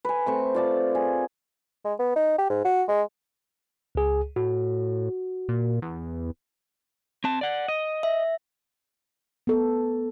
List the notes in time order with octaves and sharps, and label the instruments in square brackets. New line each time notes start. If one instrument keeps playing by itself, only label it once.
[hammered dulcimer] B4 G#5
A3 C4 C#6
F4 D5 A5
G#4
[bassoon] G#3
B3
D#4
G4
G#2
F#4
G#3
[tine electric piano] C#2 G#4
[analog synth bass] A2 [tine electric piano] F#4
[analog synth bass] A#2
E2
[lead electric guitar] C4 A5
D5 F#5
D#5
[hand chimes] E5
[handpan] B3 A4